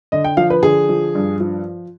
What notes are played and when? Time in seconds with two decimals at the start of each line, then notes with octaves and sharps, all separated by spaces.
0.12 D3 D#5
0.24 G5
0.37 F3 F5
0.50 B4
0.63 D3 G#4
0.89 F3
1.15 G2
1.40 F3